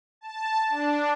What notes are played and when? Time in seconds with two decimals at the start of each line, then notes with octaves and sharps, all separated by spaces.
0.21 A5
0.69 D4